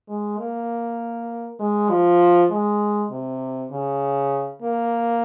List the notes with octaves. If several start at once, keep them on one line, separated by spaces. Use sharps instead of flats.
G#3
A#3
G#3
F3
G#3
C3
C#3
A#3